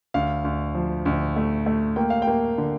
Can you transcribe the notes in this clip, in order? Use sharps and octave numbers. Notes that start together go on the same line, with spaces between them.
D2 F5
D2
F3
D2
A3
A3
A#3 G5
F5
G5
A#3
D3